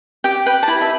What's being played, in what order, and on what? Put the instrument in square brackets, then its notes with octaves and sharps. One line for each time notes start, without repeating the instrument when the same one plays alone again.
[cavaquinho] G4 G5
B4 G5
A5
E4 B5
E5